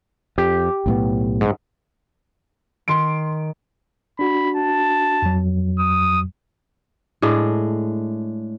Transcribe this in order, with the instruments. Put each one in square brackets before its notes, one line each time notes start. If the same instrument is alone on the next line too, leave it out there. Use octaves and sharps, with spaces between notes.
[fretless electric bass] F2 [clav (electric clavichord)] G4
[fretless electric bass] B1 A2 B3
[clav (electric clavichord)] G#2
[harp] D#3 [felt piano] C6 D7
[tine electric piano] D4 F#4 [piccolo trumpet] B5
[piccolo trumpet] A5
[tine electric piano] F2 F#3
[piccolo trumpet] D#6
[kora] A2 G#3 D4